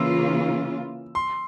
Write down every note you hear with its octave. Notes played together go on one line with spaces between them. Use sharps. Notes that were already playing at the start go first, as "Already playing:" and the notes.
Already playing: C#3 E3 A#3 F4 E6
C6